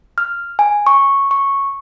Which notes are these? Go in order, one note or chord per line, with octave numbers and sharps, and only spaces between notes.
F6
G#5
C#6
C#6